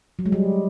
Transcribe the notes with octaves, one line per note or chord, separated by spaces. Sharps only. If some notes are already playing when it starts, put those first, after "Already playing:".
F#3
G#3
G3